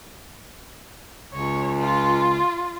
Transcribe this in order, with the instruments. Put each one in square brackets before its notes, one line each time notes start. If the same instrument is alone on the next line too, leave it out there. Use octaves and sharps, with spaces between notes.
[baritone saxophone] C#2 [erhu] C#5
[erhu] F4